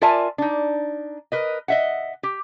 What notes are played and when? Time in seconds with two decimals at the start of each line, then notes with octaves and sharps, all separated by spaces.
0.02 F4 A#4 D5 E5 G#5 A5
0.38 D4 D#4
1.32 A#4 B4 D#5
1.68 D#5 E5 F#5
2.23 G4